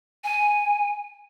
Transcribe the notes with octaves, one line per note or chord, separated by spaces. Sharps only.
G#5